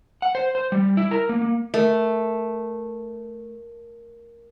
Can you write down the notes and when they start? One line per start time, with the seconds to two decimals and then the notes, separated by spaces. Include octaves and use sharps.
0.22 F#5
0.35 C5
0.55 C5
0.72 G3
0.97 E4
1.11 A#4
1.29 A#3
1.42 A#3
1.74 A3 A#4